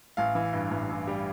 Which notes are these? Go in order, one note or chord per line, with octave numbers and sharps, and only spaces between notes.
A1 F5
E3
G2
A1
A1
G3